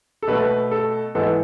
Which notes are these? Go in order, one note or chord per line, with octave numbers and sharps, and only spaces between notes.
A4
B2 A3 B4
A4
G#2 E3 B3 A4